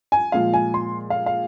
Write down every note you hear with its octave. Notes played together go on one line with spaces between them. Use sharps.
G#5
A#2 F3 G#3 F5
G#5
C6
F5
F5